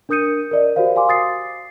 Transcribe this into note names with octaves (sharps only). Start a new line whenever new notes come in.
D4 A#4 D#6 G6 C#7 D#7
A#4 D5 D#5
F#4 G4 A#4 C5 F5
F5 G#5 C6 D6
D#6 A6 C7